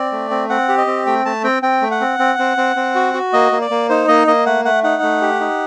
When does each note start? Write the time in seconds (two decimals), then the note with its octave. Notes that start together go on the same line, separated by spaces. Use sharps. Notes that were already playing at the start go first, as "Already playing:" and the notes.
Already playing: C4 D5
0.12 A3
0.30 C4
0.50 C4 F#5
0.69 G4
0.78 D#5
0.87 C4
1.06 A3 G5
1.25 A3 A5
1.44 C4 G5
1.63 C4 G5
1.82 A3
1.91 F#5
2.01 C4
2.19 C4
2.39 C4
2.57 C4
2.76 C4
2.95 F#4
3.14 F#4
3.33 A#3 D#5
3.52 A#3
3.61 D5
3.70 A#3
3.89 D#4 C5
4.08 A#3 D#5
4.27 A#3 D#5
4.46 A3 F#5
4.65 A3 F#5
4.84 D#4 F#5
5.02 A3
5.21 G4
5.40 D#4